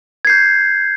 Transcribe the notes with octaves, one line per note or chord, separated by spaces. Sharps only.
G6 G#6 C7